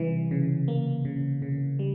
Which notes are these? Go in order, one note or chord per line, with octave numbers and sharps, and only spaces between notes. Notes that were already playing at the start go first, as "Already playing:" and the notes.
Already playing: C3 E3 G3
C#3
A#3
C#3
C#3
G3